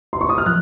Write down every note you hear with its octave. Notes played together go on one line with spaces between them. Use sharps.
C6
C#6
D#6
F6
F3 F#6